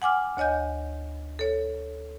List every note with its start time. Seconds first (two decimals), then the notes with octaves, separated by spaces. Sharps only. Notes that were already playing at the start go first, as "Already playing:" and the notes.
0.02 F#5 G#5 D6 F6
0.37 D2 C#5 D#5 G#5 G6
1.39 A4 C#5